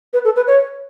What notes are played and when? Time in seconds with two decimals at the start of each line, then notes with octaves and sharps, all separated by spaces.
0.13 B4
0.25 A4
0.36 B4
0.47 C#5